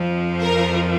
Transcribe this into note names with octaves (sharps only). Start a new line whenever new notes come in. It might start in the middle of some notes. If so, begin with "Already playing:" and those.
Already playing: F2 F3
A#4